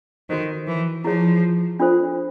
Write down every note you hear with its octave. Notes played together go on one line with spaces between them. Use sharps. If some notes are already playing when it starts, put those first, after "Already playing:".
D#3 F#4 A4 C5
E3
F3 E4 G#4 C#5
D4 F4 A4 C5